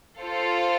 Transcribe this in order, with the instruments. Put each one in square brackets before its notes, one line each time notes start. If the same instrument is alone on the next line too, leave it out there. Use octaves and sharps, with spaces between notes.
[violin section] F4 A4 C5 F5